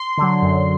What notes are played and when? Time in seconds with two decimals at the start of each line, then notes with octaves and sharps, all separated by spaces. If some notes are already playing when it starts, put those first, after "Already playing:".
Already playing: C6
0.17 D3 F#3
0.42 F#2